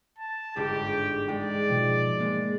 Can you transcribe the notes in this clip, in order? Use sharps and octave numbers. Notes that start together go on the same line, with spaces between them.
A5
G1 G#2 D4 G4
G#3 D#4 D5 G5
B2 F3
G#3 A#3